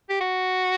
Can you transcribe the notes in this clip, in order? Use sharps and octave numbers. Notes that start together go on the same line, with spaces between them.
G4
F#4